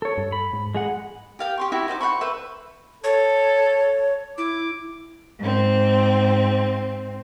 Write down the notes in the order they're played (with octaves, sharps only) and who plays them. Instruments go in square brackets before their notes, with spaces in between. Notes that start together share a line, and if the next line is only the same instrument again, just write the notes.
[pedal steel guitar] A4 C#5
[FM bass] G2
[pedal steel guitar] B5
[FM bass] G#2
[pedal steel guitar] G#3 G#4 F#5
[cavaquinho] G4 F5 G5
G4 C6 C#6
E4 F#4 G4 E5
D#4 C5 E5 D6
C5 F#5 B5 C#6
B4 C5 E5
[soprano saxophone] A4 [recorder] C#5
[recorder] E4 [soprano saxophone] D6
[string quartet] G#2 C4